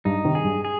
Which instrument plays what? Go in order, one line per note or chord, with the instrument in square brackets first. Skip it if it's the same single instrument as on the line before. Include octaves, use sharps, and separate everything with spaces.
[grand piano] G2 [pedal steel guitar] D#4
[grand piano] C3 D#3
[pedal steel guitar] G#4
[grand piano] G2
[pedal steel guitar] G#4